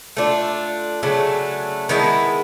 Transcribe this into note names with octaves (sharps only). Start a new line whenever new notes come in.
A3 D4 F4
C#3 F#3 A3 D4
D#3 G#3 B3 E4